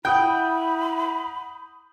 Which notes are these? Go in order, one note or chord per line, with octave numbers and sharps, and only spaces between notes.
E4 F#5 G5 B5 D#6 G6